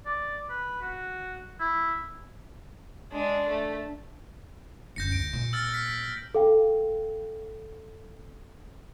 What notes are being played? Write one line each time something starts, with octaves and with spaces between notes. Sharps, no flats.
D5
B4
F#4
E4
G#3 D4
A3
F#1 D2 G6 A#6 C#7
D2 D7
A#2
E6 F6 A6
F6 B6
A4 F5 G5